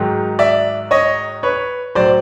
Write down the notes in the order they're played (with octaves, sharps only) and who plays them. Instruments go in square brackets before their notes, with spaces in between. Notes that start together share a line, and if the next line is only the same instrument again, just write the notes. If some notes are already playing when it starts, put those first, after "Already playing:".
Already playing: [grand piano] G#2 D#3 F#3
D5 E5
C#5 D#5
B4 C#5
A2 F#3 C5 D5